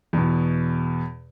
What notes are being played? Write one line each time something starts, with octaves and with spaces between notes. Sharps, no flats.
E2 B2